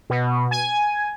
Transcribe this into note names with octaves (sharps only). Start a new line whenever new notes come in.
B2
G#5